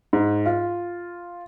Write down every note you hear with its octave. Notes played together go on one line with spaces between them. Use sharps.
G#2
F4